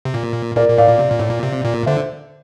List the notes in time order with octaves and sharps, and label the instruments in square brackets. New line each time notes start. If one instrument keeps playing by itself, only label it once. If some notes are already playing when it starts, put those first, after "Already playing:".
[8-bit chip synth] C3
A#2
[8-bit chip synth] A#2 [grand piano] A#4 D5
[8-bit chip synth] A#2
[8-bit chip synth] A2 [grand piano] D5 F5
[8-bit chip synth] A#2
C3
A#2
A2
A#2
C3
A#2
[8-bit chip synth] D3 [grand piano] C5 E5